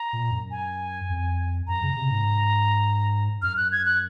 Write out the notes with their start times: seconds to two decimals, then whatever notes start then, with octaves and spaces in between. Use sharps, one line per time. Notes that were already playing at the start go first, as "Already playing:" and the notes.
Already playing: A#5
0.13 A#2
0.31 F#2
0.51 G#5
1.10 F2
1.67 F#2 A#5
1.83 C#3
1.97 C3
2.11 G#2
3.42 F#2 F6
3.57 F#6
3.72 G#6
3.86 F#6